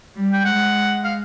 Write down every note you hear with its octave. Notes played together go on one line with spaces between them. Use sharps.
G3
G5
G#3 F#5
F5